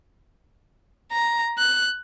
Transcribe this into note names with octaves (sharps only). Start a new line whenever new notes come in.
A#5
F#6